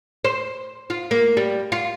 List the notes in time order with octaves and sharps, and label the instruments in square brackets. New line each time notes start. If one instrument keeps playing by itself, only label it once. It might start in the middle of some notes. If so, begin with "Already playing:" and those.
[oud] C5
F4
A#3
G3
F4